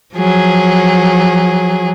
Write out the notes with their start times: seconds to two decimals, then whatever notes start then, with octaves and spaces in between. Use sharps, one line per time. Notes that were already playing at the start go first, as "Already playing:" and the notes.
0.15 F3 F#3 G#4